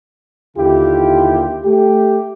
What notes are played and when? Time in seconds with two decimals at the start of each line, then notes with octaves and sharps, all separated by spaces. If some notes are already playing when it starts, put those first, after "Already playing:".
0.57 D#2 D3 E4 F4 G4
1.65 A3 G4